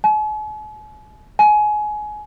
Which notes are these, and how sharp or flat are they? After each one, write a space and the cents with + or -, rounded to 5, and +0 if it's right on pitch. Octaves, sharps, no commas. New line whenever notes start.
G#5 +45
G#5 +25